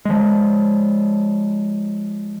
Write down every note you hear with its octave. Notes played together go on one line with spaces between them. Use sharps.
F3 G#3